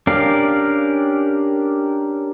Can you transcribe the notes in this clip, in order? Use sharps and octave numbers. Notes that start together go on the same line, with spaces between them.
C#4 D4 G4 A#4 F5